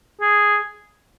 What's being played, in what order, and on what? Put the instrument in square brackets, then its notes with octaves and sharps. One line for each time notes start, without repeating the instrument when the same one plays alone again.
[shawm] G#4